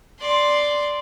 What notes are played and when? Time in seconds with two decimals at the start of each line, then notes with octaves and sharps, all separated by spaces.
0.20 D5 C6